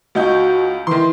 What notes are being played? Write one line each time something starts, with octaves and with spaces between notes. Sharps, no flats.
C#2 D#4 F#4 G6
D#3 E3 C6